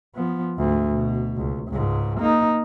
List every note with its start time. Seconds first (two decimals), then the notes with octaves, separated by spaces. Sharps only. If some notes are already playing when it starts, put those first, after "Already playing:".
0.15 F3 B3
0.57 D2 G#2
0.94 B2
1.37 C#2
1.69 C#2 G#2
2.20 A#3 D#4